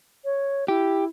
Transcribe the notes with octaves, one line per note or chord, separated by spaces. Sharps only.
C#5
E4 G4